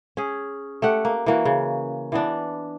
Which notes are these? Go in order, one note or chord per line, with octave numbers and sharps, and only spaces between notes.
C#4 G#4
A3 G4 F#5
A#3
E3 A#3 F#4
C#3
E3 B3 D4